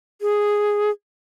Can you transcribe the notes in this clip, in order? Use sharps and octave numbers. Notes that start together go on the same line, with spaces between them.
G#4